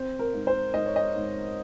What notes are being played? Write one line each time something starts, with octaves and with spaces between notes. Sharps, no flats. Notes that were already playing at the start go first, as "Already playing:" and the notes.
Already playing: C4 C5
A#4
G#2
C5
G#2 D#5
C#5
D#5
G#2